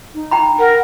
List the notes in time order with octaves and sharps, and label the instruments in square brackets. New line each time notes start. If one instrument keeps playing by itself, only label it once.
[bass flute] D#4
[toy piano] G5 A#5 B5
[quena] A#4 [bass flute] F#5